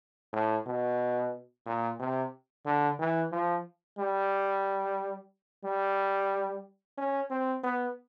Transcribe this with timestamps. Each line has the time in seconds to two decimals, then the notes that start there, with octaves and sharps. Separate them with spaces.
0.33 A2
0.66 B2
1.66 A#2
1.99 C3
2.65 D3
2.99 E3
3.32 F3
3.98 G3
5.64 G3
6.97 C#4
7.30 C4
7.63 B3